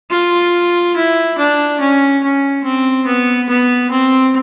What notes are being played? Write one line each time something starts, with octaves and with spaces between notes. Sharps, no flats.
F4
E4
D4
C#4
C#4
C4
B3
B3
C4